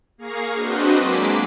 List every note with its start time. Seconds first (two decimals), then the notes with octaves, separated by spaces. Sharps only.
0.18 A#3 G#4 F5 A#5 C#6 C7
0.55 C4 D4 F#4 B4 C5 D#5
0.98 F#3 G#3 A#3 G#4 D6 B6